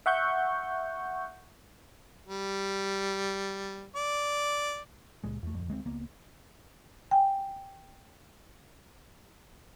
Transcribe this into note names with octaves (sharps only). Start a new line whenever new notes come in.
E5 F#5 C#6 G6
G3
D5
C#2 A#2 G#3
E2 A3
D1 F2
D2 G#3 B3 C4
C#2 A#3 B3
G5 G#5